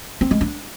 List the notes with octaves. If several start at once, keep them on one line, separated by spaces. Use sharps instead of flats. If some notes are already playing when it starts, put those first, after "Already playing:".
C4
G#3
D4